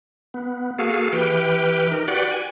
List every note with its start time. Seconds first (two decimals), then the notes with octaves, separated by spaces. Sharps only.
0.34 B3
0.79 A#3 F#4 G#4 A4 F5
1.13 E3 G4 B4 G5 F6
1.91 D#4 A#4
2.08 F#4 G4 B4 D5 F#5 G5
2.31 G#5